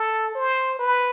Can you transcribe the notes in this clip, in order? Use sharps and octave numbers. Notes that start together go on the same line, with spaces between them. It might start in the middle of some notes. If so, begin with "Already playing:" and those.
Already playing: A4
C5
B4